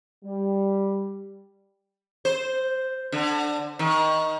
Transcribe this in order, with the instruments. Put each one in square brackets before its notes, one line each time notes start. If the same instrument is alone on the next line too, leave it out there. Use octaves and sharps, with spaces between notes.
[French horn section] G3
[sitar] C5
D3
D#3